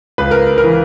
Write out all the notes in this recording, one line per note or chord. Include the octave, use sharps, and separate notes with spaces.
C#2 B4
A#4
A#4
E3